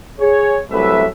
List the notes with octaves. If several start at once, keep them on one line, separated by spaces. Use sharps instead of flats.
G#4 C#5
C2 F#3 A3 B4 E5